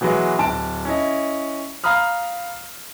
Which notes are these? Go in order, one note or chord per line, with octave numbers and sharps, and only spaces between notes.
B2 E3 F#3 G#3 B3
D1 A5 D7
C#4 E4 D#5
F5 A#5 B5 D#6 F6